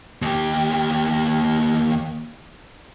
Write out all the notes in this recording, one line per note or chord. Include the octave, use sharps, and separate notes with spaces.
D#2 G4